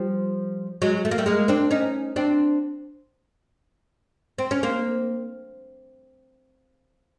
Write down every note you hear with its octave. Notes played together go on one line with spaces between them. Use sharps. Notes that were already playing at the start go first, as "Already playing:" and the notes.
Already playing: F3 G3
F#3 G#3
A3
A#3
G3 A3
G#3 A#3
C4 D4
C#4 D#4
C4 D4
C4
C#4
A#3 C4